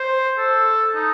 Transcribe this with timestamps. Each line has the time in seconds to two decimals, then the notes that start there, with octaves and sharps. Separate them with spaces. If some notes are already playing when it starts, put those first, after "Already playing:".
Already playing: C5
0.38 A4
0.95 D#4